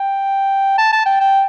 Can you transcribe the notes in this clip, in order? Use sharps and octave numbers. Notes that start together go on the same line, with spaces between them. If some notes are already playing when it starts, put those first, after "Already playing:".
Already playing: G5
A5
A5
G5
G5